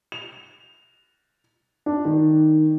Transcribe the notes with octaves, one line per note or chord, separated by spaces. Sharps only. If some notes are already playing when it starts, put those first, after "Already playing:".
F7
D4
D#3